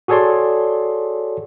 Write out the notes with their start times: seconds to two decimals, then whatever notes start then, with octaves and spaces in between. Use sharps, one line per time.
0.08 F#4 G#4 A4 C#5 D5 C6